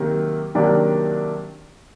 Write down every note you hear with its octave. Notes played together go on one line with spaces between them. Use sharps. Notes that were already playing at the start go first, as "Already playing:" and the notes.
Already playing: C3 D#3 F#3 A#3
C3 D#3 F#3 A#3 D4